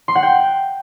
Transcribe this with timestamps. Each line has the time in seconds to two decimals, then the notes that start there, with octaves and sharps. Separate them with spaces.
0.08 C6
0.15 F#5
0.23 G5